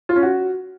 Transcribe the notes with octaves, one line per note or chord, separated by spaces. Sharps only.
F4
C#4
F#4